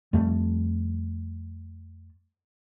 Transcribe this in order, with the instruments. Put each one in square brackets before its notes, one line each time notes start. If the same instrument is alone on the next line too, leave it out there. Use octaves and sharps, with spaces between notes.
[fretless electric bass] F2 G3 A3